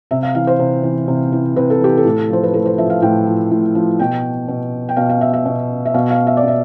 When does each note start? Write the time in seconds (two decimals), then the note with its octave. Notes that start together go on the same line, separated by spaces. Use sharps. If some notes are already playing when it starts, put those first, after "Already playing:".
0.11 C3 E5
0.23 F5
0.35 E3 F5
0.47 C5
0.59 C3
0.83 E3
1.08 C3
1.32 E3
1.56 C3 B4
1.70 A4
1.81 E3 G4
1.97 A4
2.05 A2
2.30 F3 C5
2.43 B4
2.54 A2 A4
2.66 C5
2.78 F3 E5
2.90 F5
3.02 A2 G5
3.27 F3
3.51 A2
3.75 F3
3.99 B2 G5
4.48 B2
4.89 G5
4.96 B2 F5
5.09 F5
5.21 E5
5.33 E5
5.46 B2
5.86 E5
5.94 B2 F5
6.10 F5
6.27 E5
6.37 D5
6.43 B2 E5